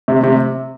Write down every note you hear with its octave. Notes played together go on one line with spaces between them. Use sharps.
C3
C3